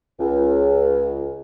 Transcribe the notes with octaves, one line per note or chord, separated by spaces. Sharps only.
C#2